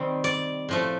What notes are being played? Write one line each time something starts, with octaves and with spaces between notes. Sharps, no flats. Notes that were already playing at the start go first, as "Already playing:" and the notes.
Already playing: C3 D#3 G3 C4
D5
A2 F3 A3